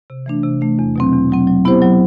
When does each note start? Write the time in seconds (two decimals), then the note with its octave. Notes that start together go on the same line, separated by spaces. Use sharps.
0.10 C3
0.26 E3 A3 D4
0.43 C3
0.61 E3 A3 D4
0.79 E2
0.96 B2 F#3 C4
1.13 E2
1.30 B2 F#3 C4
1.47 F#3
1.65 B3 E4 G4 C5
1.82 F#3